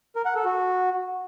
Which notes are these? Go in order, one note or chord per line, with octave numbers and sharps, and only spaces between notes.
A#4
F#5
A4
F#4